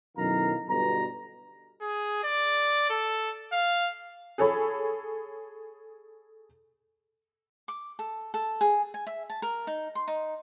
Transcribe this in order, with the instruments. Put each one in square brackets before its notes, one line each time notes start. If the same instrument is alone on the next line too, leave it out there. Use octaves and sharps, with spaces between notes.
[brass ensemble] B1 F#2 D#3 E4 F5 A#5
G1 B2 A#5
[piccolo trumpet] G#4
D5
A4
F5
[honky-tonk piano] G#4 A4 C#5 B5
[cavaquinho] D6
A4
A4
G#4
G#5
E5
A5
A#4
D#4
C6
D#4